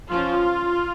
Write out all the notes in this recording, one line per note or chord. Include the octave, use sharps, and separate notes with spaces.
F3 C#4 F4